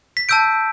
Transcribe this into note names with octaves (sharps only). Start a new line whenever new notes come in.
B6
A5 E6 G6 D7